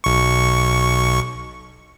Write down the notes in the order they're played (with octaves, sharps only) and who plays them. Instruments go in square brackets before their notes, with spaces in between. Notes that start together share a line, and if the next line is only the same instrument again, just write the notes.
[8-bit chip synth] B1 C#6